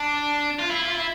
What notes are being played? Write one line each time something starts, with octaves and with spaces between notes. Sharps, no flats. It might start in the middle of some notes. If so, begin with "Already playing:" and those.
Already playing: D4
F4
E4
F4
E4